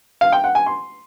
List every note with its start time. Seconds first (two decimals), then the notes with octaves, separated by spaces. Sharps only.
0.21 F5
0.32 G5
0.44 F#5
0.55 G#5
0.66 C6